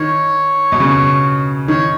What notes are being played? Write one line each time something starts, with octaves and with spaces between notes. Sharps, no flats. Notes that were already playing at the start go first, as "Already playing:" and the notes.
Already playing: D#3 C#5
B2
C#3
D#3 C#5